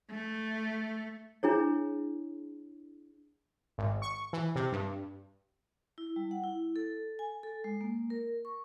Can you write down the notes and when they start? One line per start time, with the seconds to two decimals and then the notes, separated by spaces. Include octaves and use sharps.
0.11 A3
1.43 D4 E4 G#4 C#5
3.78 G#1
4.02 C#6
4.33 E3
4.56 C3
4.72 G2
5.98 E4
6.16 G3
6.31 F#5
6.44 E4
6.76 A4
7.19 G#5
7.43 A4
7.64 G#3
7.81 A#3
8.10 A#4
8.45 C#6